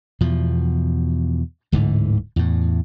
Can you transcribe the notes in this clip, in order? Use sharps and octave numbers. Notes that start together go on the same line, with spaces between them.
E2 B2 F3
D1 G#2 D3 E3
E2 A2